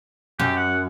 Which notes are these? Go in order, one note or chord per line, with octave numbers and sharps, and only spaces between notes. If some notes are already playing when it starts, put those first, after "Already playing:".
F#2 G4
F#5